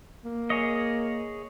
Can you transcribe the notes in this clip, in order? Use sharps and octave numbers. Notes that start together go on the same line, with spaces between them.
A#3
G#4 C#5 D#5